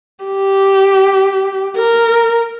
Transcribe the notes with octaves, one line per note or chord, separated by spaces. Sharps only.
G4
A#4